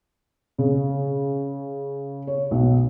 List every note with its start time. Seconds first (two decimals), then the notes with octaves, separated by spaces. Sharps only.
0.58 C#3
2.27 C#5
2.51 B1